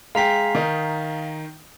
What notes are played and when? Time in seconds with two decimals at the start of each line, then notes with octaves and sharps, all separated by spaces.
0.15 G#3 F5 G5 A#5 B6
0.55 D#3 D#4